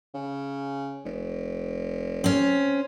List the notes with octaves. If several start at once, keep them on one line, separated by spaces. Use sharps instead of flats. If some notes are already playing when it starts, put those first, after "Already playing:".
C#3
F1
C4 C#4